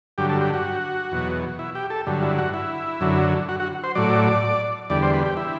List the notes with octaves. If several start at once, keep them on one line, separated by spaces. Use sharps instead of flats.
G2 D3 F#3 G4
A4
G4
F#4
E2 B2 F#3
E4
G4
A4
G2 D3 F#3
E4
F#4
E4
F#2 D3 F#3
F#4
F#4
C5
A2 F#3 D5
E2 D3 G3 D5
C5
B4
G4
E4